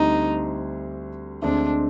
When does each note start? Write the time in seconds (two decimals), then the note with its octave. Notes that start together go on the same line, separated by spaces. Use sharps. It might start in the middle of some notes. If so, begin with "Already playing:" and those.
Already playing: D2 D3 G3 C4 D#4
1.42 D2 D3 G#3 C4 D4